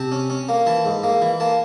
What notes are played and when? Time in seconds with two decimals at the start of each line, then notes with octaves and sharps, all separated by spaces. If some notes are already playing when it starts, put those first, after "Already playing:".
Already playing: C3 A5
0.12 C#4
0.30 C#4
0.49 A#3
0.66 E3 A5
0.85 G#2
1.03 A#3
1.22 E3
1.40 A#3 A5